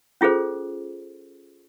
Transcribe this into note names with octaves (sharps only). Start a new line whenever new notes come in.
C#4 F4 G#4 A4 C5